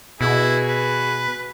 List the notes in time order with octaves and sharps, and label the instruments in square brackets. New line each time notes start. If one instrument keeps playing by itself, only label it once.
[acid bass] B2 [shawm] E4 [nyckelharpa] F#4 G#4
[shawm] B4